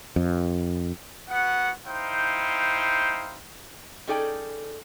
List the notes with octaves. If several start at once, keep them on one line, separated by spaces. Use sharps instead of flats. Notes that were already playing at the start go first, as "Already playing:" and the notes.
F2
B3 F#4 F#5
D#4 E4 C5 F5 G5
C#4 D#4 G#4 A4 D5 G5